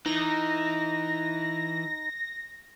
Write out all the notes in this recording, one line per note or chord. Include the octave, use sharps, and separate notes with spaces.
E3 D#4 A#6